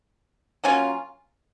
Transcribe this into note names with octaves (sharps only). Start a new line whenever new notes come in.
F#3 A#3 C#4 F4